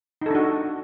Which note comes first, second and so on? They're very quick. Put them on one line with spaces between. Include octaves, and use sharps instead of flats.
D#4 A4 D4 F#4